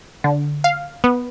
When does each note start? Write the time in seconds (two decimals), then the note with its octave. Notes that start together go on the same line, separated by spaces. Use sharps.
0.24 D3
0.64 F5
1.04 B3